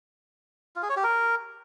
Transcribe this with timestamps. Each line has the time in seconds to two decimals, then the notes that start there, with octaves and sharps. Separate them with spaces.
0.76 F4
0.83 G#4
0.90 C#5
0.97 G4
1.04 A#4